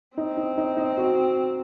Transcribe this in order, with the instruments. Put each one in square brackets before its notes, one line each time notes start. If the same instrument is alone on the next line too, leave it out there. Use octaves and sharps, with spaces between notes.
[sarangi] C4 [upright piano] D#4
[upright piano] D#4
D#4
D#4
F#4